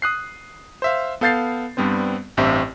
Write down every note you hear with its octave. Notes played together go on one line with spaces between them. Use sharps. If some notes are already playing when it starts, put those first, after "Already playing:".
D#6 F#6 C7
C5 E5 F5
B3 A4 F5 G6 A6 C7
G2 G3 B3 C4 C5
A1 G2 C4 G4 E5